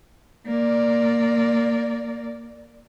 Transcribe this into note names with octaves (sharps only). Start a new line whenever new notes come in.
A#3 D5